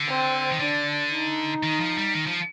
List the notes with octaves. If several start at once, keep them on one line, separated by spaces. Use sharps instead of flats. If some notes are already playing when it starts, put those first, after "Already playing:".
Already playing: D3
C4
D#3
D3 D4
D#4
D#3
F3
G3
D#3
F3